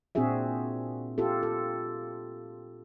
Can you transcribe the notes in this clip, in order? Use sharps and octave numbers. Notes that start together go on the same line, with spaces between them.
A#2 C4 D4 F#4 G#4 E5
F4 G4 A4
A4